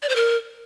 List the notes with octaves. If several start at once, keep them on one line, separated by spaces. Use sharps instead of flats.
D5
C5
A#4